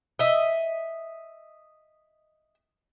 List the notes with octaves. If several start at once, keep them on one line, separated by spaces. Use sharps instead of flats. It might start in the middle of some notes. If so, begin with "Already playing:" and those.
D#5 E5